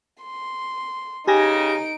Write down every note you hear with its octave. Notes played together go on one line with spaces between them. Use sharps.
C6
C#3 D#4 G4 G#5 A#6 D7